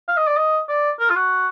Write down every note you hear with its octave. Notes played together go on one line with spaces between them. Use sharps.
F5
D#5
D5
D#5
D5
A#4
F4
F#4